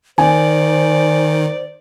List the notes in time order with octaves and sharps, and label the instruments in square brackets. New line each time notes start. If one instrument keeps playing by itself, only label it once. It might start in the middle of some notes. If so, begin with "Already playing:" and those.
[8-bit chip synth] D#3 [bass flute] C5 [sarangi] D5 [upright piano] G#5